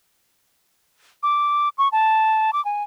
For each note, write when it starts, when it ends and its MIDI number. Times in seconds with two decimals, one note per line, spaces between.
1.23 1.69 86
1.78 1.88 85
1.92 2.51 81
2.53 2.63 86
2.65 2.83 80